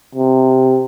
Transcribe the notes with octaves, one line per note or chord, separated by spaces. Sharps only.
C3